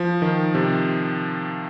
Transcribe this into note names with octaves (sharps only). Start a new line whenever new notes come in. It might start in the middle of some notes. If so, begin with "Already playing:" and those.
Already playing: F3
D#3
C3